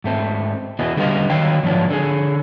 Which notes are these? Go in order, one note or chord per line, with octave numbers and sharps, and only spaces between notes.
G#2 A3 C4
E2 B3 E4 F#4 D#5
D3 G3 A3 B3 D#5 F5
D#3 F#3 F5 G5
G#2 F3 F#3 B3 D4 F4
D3 G#4